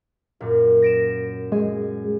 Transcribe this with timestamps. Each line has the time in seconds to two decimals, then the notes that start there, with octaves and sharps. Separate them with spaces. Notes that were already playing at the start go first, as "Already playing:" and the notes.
0.40 F#2 A#2
0.82 A#6 D7 E7
1.52 G#3 G#4